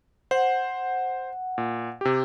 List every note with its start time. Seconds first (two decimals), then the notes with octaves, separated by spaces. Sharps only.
0.31 C5 F#5
1.58 A#2
2.01 C3 G4